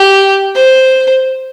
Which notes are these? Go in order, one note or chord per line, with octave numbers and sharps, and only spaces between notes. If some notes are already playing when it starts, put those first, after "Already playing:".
Already playing: G4
C5